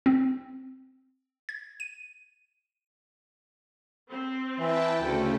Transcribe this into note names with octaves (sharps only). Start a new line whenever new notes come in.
C4
G#6
D#7
C4
E3 E4 E5 G5 A5
D2 C#3 A3 G5